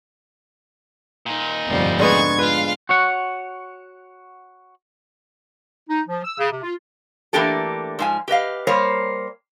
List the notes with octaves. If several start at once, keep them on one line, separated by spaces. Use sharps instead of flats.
A#2 D#4
F1 D2 G2 B2 F3 G3
G#2 D3 G#3 B3 C#6 G#6
F4 B4 F5
F#4 C#5 F#5
D#4
F3
E6
C#3
C3
F4
E3 A3 A#3 D4 G4 A4
G#2 F3 G#5
G4 B4 D#5 F5
G3 A#3 C5 C#5